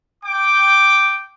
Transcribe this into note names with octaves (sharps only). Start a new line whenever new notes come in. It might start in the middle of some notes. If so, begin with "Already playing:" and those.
G5 D6